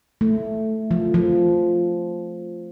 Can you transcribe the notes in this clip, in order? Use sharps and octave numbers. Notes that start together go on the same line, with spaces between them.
A3
F3
F3